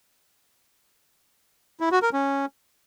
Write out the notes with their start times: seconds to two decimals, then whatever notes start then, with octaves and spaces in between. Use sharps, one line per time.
1.80 E4
1.91 F#4
2.02 A#4
2.13 C#4